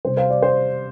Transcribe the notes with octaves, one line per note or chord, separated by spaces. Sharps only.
C3 G3 C5
C5 F5
D5
C5